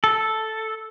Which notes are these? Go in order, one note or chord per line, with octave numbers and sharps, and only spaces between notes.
A4